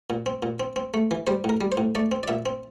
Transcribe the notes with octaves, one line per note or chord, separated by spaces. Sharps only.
A#2
C4
A#2
C4
C4
A3
E3
G3 C5
A2
A#4
G3
C5
A2
A3 D5
C4
D5
A#2 E5
C4